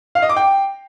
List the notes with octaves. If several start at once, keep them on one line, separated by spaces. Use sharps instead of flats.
F5
D#5
D6
G5